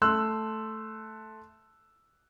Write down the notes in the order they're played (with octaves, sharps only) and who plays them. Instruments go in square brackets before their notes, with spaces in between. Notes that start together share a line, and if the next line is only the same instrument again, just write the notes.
[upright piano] A3 C6 E6 F#6